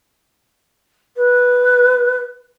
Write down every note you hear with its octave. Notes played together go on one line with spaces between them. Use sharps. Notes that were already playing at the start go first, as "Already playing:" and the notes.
B4